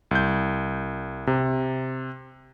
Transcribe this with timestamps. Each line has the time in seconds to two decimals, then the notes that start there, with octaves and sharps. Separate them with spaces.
0.11 C2 G6
1.27 C3